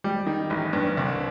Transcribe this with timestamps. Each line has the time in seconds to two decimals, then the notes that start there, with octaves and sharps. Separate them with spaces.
0.04 G3
0.26 D#3
0.50 A1
0.73 G2
0.97 C2